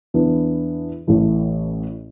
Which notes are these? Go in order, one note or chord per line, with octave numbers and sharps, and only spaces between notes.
E2 E3 B3 D4
A1 A2 E3 A3